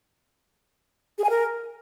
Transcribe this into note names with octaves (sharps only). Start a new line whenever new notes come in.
G#4
G#5
A#4